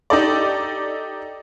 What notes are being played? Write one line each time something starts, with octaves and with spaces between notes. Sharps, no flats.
D#4 G4 A4 D5